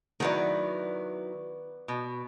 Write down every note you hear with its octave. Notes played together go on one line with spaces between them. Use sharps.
D#3 F#3 B3 E4 B4 D5
B2